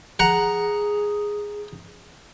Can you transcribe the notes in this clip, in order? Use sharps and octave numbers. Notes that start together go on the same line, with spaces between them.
G#4 F#5 A#5